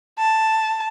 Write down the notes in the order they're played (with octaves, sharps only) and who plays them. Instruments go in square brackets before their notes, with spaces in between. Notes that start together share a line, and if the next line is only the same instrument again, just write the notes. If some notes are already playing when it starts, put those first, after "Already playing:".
[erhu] A5